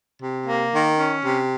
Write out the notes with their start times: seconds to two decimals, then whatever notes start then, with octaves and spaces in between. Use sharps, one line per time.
0.21 C3
0.46 A#3
0.72 D#3
0.98 C#4
1.23 C3